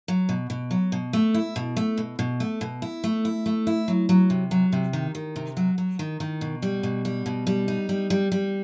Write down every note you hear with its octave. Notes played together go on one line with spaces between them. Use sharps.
F#3
B2
B2
F#3
B2
A3
E4
B2
A3
B2
B2
A3
B2
E4
A3
E4
A3
E4
F#3
F#3
C3
F#3
C3
D#3
D#3
C3
F#3
F#3
D#3
D#3
B2
G3
B2
G3
B2
G3
D#4
G3
G3
G3